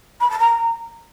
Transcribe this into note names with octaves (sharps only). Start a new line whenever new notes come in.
B5
A5
A#5